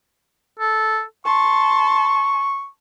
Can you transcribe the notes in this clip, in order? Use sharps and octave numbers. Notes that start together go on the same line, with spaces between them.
A4
A5 C6 C#6